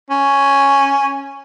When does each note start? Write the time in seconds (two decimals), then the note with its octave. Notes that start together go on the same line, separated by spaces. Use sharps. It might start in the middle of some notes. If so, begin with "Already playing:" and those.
0.11 C#4